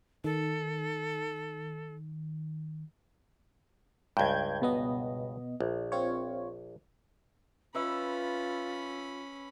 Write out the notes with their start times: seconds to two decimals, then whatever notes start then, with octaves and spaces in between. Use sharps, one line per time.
0.24 D#3 A4
4.17 C#2 G2 G5 G6 G#6
4.62 B2 B3 D#5
5.61 A#1
5.92 C4 F4 C#5
7.75 C#4 F4 B4 E5 B5